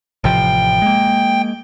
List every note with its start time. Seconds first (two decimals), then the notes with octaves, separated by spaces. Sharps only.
0.24 A1 C3 F3 G5
0.82 G#3 A#3